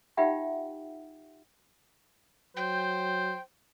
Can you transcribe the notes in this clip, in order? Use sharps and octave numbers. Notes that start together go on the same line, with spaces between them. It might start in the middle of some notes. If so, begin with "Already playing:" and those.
D#4 F4 G4 E5 F#5 G5
F#3 C5 G5